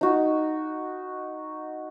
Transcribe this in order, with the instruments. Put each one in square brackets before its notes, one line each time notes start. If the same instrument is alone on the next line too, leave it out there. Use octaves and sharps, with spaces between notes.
[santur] D#4 F#4